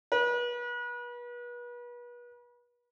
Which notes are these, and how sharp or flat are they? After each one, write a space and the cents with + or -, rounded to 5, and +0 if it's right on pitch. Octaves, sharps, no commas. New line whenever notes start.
B4 -35